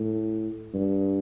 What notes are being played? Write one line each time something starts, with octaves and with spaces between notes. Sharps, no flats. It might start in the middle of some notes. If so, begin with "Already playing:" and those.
Already playing: A2
G2